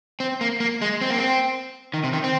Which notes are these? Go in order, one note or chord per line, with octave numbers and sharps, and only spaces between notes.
C4
A#3
A#3
G#3
C4
A#3
C4
D#3
C3
D#3
C4